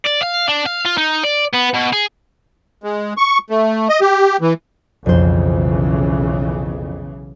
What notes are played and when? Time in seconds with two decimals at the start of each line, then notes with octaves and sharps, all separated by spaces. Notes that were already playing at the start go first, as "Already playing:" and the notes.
0.05 D5
0.22 F5
0.48 D4
0.66 F5
0.85 F4
0.98 D#4
1.24 D5
1.54 B3
1.74 B2
1.93 G#4
2.83 G#3
3.17 C#6
3.50 A3
3.89 D#5
4.01 G4
4.41 E3
5.06 B1 F2 C#3 E3 C5